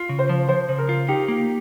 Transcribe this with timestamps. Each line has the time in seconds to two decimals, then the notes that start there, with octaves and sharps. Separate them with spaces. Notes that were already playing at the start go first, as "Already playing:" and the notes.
Already playing: F4
0.09 C#3
0.19 C5
0.29 F3
0.49 F3 C5
0.69 C#3
0.78 A#4
0.89 F4
1.08 D#4 G4
1.28 A#3